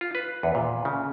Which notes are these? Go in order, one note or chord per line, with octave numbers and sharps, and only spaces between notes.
F4
B4
E2
A#2
C#3